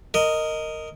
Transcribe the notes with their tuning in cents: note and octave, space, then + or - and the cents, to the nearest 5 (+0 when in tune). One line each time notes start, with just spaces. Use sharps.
A#4 -15 D#5 +0